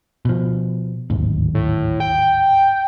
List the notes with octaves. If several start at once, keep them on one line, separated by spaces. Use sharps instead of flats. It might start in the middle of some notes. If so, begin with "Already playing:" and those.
B2 F3
D1 G#1 D#2
A2
G5